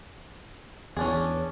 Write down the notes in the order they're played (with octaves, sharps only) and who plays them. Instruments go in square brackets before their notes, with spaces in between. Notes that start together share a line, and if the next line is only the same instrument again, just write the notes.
[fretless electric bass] E2 [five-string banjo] C#4 D4 G#4